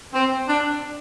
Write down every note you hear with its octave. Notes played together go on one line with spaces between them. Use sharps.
C4
D4